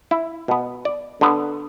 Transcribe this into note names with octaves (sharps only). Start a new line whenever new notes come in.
E4
B2 B3
D5
D3 B3